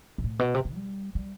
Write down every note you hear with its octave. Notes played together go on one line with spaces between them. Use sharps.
A#2
A2
B2
C3
C#3
G3
G3